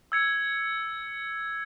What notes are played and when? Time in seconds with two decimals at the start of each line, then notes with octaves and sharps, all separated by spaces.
0.12 E6 G#6 C#7